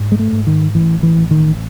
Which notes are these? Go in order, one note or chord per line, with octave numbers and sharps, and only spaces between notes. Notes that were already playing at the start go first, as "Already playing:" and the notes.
Already playing: G#2
G#3
A3
G#2
D#3
A1 E3
E3
A1
D#3